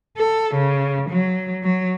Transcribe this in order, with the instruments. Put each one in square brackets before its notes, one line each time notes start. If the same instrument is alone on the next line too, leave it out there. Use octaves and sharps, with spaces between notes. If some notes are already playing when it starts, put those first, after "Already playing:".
[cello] A4
C#3
F#3
F#3